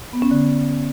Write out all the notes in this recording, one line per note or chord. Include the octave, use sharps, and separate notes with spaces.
B3
C#4
D3